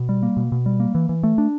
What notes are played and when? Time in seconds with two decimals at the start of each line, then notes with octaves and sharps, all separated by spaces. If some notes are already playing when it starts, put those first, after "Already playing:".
Already playing: B2
0.09 G3
0.23 A#3
0.37 B2
0.52 B2
0.66 G3
0.80 A#3
0.95 E3
1.09 E3
1.23 A3
1.38 D4